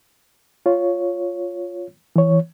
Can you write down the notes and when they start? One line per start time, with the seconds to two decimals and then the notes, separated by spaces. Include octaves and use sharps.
0.66 F4 C#5
2.16 E3 C#5